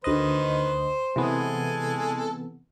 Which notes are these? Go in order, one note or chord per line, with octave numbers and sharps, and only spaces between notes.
D2 D#3 B4 C5 D#5
C3 E3 G#3 B3 A4 G#5